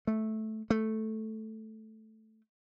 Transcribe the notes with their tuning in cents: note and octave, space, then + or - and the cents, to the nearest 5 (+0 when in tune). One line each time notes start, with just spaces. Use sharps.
A3 -10
A3 -5